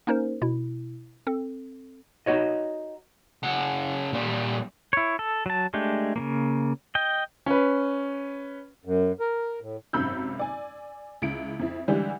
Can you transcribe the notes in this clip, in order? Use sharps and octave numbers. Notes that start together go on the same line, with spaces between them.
A#3 C#4 D#4 A#4 C5
B2 E4
C4 A4
D#4 F#4 C#5 D#5
C#3 F#5
A#2 G3
E4 C#5
A4
F#3 A5
G#3 A3 D4 G4
C#3 F3 A#3
D#5 G5
C#4 B4
F#2
A#4
A2
G#1 F#2 C3 B5 E6 G6
D5 G#5
C#2 E4 D7
F2 E4
D3 E3 G3 G#3 D4